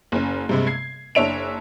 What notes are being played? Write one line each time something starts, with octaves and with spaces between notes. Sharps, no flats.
F#1 C#4
G2 C3 G#3
G#6 C7
F#1 D4 C#5 E5 D7 F7